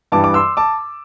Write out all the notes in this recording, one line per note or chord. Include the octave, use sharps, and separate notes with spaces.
G2 E3 G3 A5 D6
D6
C6 E6
A5 D6